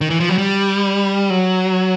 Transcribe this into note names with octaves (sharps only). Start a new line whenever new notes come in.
D#3
E3
F3
F#3
G3
F#3